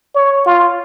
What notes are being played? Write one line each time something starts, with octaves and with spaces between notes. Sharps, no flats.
C#5
F4